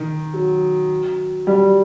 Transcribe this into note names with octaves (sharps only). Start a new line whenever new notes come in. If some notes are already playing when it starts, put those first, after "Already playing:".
Already playing: D#3
F#3
G3